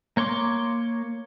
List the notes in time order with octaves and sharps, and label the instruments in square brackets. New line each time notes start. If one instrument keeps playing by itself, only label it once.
[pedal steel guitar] A#3 C#5 C6 D6